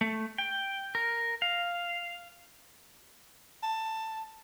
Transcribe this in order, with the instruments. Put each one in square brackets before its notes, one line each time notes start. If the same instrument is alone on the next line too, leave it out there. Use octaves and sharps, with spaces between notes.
[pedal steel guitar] A3
G5
A#4
F5
[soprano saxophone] A5